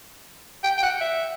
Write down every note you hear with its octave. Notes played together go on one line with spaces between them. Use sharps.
G5
G5
F#5
E5